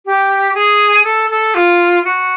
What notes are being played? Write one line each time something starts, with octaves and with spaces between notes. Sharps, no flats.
G4
G#4
A4
A4
F4
F#4